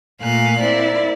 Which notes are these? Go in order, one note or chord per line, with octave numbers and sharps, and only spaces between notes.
A#2 A3 F5 G#5 F#6
C4 E4 A#4 D5